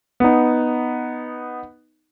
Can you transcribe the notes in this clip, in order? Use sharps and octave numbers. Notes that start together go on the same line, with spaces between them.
B3 D#4